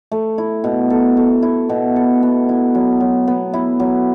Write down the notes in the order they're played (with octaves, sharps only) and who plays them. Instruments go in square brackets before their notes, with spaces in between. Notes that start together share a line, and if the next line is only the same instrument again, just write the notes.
[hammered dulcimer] A3
E4
B2
A4
A3
E4
B2
A4
B3
E4
F#3
F#3
B3
E4
F#3